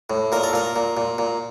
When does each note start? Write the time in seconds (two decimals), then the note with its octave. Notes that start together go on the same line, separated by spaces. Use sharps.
0.10 A2
0.32 A#2 A#4
0.43 A4
0.53 A#2 A#4
0.76 A#2
0.97 A#2
1.18 A#2